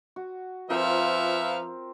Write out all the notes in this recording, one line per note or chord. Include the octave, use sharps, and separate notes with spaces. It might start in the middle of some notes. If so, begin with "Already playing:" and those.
F#4
F3 C4 F4 A#4 B4 E5 F5